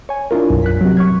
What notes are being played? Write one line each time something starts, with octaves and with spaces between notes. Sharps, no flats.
C#5 G#5
D4 E4 F4 A#4
B1 F#2
F#6 B6
C3 F#3
C#6 F6 G#6